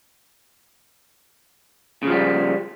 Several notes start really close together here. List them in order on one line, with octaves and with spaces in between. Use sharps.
C#3 F3 G3